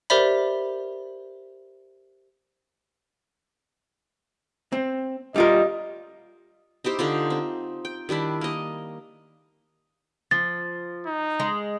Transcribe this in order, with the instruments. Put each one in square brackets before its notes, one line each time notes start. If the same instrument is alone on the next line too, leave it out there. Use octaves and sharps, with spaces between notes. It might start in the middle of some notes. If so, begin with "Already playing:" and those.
[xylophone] G4 A#4 C5 D5 E5 B5
[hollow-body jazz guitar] C4
[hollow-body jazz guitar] G3 F4 A#4 [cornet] D#5
[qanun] D#4 E4 G4 C5
D3 D#4 F4
C4
G5
D#3 G3 D4 E4
A#3 D#5
[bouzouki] F3 [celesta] A6
[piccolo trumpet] D#4
[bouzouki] G#3